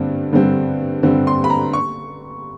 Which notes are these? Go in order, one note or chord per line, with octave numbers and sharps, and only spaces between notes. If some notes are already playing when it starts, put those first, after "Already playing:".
Already playing: G2 D3 G3 C4
G2 D3 G3 C4
G2 D3 G3 C4
C6
B5
A#5
C#6